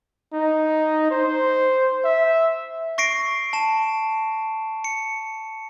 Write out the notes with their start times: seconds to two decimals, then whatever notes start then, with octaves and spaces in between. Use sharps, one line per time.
0.33 D#4
1.11 C5
2.04 E5
2.98 C#6 A#6 C7 D7
3.53 A5 E7
4.84 C#7